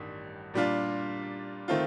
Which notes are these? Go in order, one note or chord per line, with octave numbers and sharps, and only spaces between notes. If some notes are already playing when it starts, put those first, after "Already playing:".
Already playing: A1 G2 D#3 G3
A#2 G3 D4 F4
D#3 A3 C4 F4